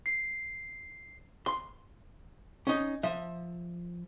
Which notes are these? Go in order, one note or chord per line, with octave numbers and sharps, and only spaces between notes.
C7
C6
C#4 D#4
F3 E5